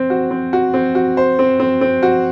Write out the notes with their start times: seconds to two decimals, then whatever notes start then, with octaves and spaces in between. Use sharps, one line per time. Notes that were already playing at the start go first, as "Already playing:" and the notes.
Already playing: C4 C5
0.10 F#4
0.31 C4
0.53 F#4
0.74 C4
0.95 F#4
1.17 C5
1.39 C4
1.60 C4
1.81 C4
2.03 F#4